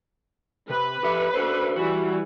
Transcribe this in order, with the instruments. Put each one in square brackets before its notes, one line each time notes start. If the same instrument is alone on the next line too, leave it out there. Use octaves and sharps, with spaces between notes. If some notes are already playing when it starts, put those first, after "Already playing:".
[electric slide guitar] C3 [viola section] B4
[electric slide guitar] G4 A4 E5
F#4 A4 C5
[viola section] E3 G3 [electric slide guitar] F#4